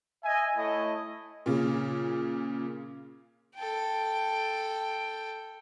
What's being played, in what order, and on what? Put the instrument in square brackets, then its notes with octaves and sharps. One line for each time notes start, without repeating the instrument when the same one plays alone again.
[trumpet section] D#5 E5 G#5
A3 E4 A4 C#5 D#5
[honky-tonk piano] A#2 C#3
[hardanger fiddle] A4 G5